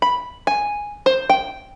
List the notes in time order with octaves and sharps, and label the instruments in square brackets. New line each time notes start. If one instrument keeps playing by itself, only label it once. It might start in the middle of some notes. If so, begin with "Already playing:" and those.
[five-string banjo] B5
G#5
C5
G5